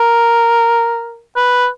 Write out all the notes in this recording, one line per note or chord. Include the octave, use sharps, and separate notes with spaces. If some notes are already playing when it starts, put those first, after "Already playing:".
Already playing: A#4
B4